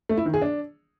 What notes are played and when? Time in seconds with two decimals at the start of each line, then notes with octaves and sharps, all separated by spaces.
0.09 A3
0.17 E4
0.26 D#3
0.34 G#4
0.42 D4